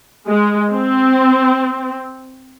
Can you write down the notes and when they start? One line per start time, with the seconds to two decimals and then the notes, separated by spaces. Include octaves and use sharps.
0.28 G#3
0.72 C4